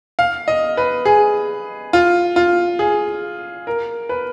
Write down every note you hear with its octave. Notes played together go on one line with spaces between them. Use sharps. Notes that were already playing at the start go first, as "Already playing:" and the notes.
F5
D#5
B4
G#4
F4
F4
G#4
A#4
B4